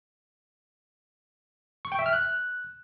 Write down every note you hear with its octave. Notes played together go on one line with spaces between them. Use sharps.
C#6
G5
E5
F6
F#6